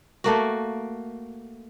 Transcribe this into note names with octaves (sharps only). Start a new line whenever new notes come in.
A3 A#3 F#4